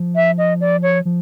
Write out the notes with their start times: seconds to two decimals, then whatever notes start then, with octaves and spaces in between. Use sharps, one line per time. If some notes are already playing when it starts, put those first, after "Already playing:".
Already playing: F3
0.15 E5
0.38 D#5
0.61 D5
0.83 C#5
1.05 F3